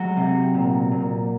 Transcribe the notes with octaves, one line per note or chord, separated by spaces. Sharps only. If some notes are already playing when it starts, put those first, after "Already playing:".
Already playing: F#3 G#3 F#4
C3
A#2
A#2